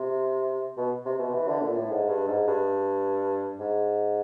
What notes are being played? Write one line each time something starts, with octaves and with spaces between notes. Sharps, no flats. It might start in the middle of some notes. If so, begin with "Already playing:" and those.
Already playing: C3
B2
C3
B2
E3
D3
A#2
A2
G#2
G2
G#2
G2
G#2